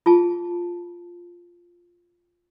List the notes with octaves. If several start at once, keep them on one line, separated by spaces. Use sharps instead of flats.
F4 G#4 A5